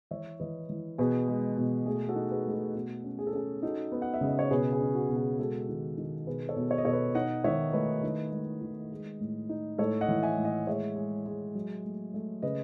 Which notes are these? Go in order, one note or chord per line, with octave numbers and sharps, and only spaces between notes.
E3 C#5 E5
E3 B4 D#5
E3
B2 G#4 B4
G#3
B2
A3 G#4
F#4 A4
D#4
G#4 B4
A3
F#4 A4
B2 F#4
C#4
G#4
A4
C#4 G#4
D#4 F#4 A4
B3
F#5
E5
C#3
D#5
C#5
B2 G#4 B4
G#4
C#4
F#4
B2
G#4
G#3 F#4 A4
D#3
D#3
B2 G#4 B4
A4 C#5
B2
C#5
D#5
B2 A4 C#5
B4 D#5
D#4 D#5 F#5
D#3 C#5 E5
A3 B4 D#5
D#3
A3
D#3
G#3
A2
D#4
A2 A4 C#5
D#5 F#5
E3
E5 G#5
A2
D#5 F#5
G#3 C#5 E5
G#3
G#3
F#3
A3
A3
C#3 B4 D#5